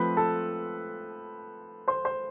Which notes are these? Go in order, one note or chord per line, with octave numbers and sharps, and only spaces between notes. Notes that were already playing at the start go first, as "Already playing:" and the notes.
Already playing: F3 A3 C4 B4 B5
A4 A5
C5 C6
C5 C6